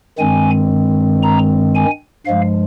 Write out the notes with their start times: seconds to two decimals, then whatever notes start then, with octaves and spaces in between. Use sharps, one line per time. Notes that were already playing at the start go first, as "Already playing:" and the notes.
0.19 G2 D#3 G#3 C4 G#5
1.23 A#5
1.75 G#5
2.26 G2 F3 G#3 F5